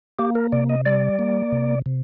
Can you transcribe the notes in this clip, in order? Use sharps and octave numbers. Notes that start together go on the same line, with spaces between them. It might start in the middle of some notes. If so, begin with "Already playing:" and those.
A#3 G4
A#4
C3 D5
D#5
G3 D5
A#3
C3
C3